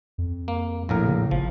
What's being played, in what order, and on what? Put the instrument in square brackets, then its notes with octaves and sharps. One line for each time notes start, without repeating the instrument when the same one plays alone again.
[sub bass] F2
[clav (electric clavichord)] A#3
A#1 A2 A#4
[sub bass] C#3
[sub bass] G1 [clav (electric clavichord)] F3